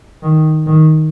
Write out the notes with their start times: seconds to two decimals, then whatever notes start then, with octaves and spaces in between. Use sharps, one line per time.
0.23 D#3
0.67 D#3